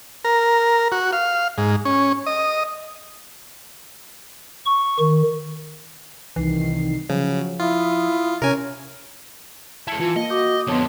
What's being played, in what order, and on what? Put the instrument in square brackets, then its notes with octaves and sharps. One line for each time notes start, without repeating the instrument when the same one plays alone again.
[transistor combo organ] A#4
F#4
F5
G#2
C#4
D#5
[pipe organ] C#6
D#3
[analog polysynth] C2 D#3 C7 [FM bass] E3
[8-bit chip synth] C#3 [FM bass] F3 [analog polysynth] F#3
[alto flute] E4 [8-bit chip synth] F4 [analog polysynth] D#6
[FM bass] C3 [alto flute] C#4 [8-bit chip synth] A#4 G#5
[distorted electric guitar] G#3 E4 [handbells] A5 C#7
[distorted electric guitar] E3 [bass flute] F4
[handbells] A#3 [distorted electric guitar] D#5
[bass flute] F#4 [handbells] D6 D#6 G6
[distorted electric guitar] F2 D3 [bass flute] B3 [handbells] C#5 A5 C6